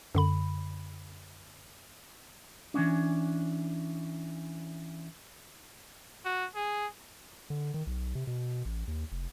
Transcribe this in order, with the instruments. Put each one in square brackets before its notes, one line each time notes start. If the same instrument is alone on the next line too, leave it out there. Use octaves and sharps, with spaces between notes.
[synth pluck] F#2 D3 B5
[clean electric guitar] E3 A#3 C#4 D4
[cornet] F#4
G#4
[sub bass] D3
D#3
B1
C3
B2
A1
D#2
F1